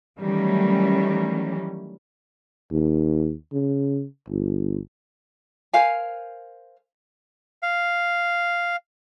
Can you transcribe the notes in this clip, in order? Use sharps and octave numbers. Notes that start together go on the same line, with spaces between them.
D#3 E3 F#3 G3 A3 C#4
D#2
C#3
G1
A#4 C5 F5 G#5
F5